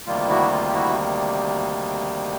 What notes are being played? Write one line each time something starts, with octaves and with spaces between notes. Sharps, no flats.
D2 C3 D#3 G3 A#3 F4
E4 F#4
F4
G4
E4 F#4